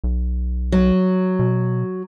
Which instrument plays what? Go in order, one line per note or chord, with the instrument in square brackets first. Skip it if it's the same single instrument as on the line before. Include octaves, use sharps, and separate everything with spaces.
[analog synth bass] B1
[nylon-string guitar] F#3
[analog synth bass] B2